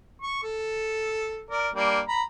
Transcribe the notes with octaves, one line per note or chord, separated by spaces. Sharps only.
C#6
A4
A#4 D5
G3 A#3 D4
A#5 B5